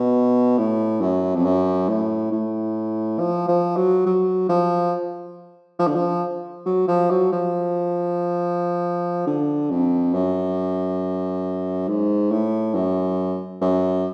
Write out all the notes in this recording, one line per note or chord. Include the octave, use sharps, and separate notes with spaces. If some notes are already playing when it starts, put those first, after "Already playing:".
Already playing: B2
A2
F#2
F2
F#2
A2
A2
F3
F3
F#3
F#3
F3
F3
D3
F3
F#3
F3
F#3
F3
D3
F2
F#2
G#2
A2
F#2
F#2